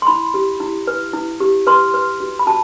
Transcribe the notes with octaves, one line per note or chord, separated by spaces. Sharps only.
C6
E4 B5
G4
E4
B4
E4
G4
B4 C6
B4
F#4
B5
F#4 A5